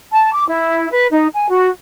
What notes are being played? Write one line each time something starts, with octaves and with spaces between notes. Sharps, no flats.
A5
D6
E4
B4
D#4
G#5
F#4